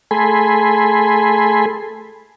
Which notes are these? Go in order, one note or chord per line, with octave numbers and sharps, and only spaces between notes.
A3 G#4 A4 G#5 B5 C6